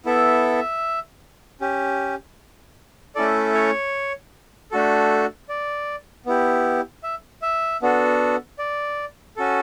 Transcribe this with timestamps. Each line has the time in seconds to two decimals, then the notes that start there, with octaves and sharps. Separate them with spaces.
0.05 B3 E4 A4 E5
1.61 C#4 G4
3.15 A3 C#4 E4 A4 D5
3.54 C#5
4.71 A3 D4 F#4 A4
5.49 D5
6.26 B3 E4 G4
7.03 E5
7.42 E5
7.82 B3 D4 F#4 A4
8.59 D5
9.37 C#4 F#4 A4